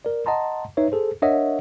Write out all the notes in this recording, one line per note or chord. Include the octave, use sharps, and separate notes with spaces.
A#4 D5
D#5 F#5 A5 A#5 C6
D#4 B4 C#5 E5
G#4 A4 C5
D4 A#4 C#5 D#5 E5 F#5